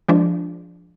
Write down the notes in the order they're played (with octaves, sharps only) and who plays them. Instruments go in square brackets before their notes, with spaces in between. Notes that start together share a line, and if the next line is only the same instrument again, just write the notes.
[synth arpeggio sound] F3 G#3 D4